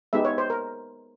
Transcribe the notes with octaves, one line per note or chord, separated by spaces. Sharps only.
G#3 B3 D#4 G4 E5
C#5
C5
A#4